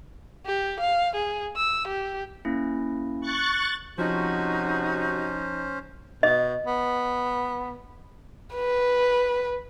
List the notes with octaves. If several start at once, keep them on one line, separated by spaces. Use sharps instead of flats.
G4
F5
G#4
E6
G4
A#3 C#4 E4
C#6 F#6 A6
C3 F3 C#4 D#4 F#4 C5
B2 D#5
B3
B4